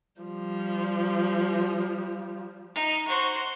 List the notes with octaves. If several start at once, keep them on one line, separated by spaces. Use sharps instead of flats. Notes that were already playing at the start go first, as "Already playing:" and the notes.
F3 G3
D#4
F#4 C5